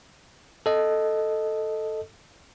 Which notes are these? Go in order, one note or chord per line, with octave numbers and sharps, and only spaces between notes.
A4 D#5